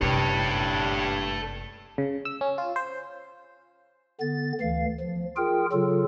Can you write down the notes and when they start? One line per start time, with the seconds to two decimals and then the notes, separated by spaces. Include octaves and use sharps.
0.01 F#1 G2 C3 A4 C#5
1.98 C#3
2.25 E6
2.41 C#4
2.58 F4
2.76 C5
4.21 D3 B3 A6
4.61 D2 E3 F5
5.00 F3
5.37 F4 G#4 A#4 G5
5.72 C#3 F#3 F4 A4